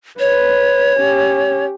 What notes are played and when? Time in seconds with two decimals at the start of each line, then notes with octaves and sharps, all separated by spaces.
0.19 B4 C#5
0.97 C#4 G4